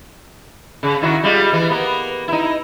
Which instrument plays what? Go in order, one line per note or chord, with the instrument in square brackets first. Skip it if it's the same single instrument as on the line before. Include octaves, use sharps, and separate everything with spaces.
[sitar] C#3
D#3 E4 F#4
G3 G#3 F4
E3
A#3 B3
D#4 E4